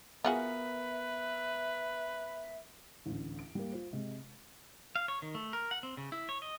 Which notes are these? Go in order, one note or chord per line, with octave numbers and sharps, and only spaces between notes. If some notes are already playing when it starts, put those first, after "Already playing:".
B3 F4 F#4 G#4 A#4 B4 E5
A1 D2
D7
G3 A#3
F4 C5
C3 G#3
F5
C#5
D#3
A3
A#4
F#5
C4
C#3
E4
C#5
D#5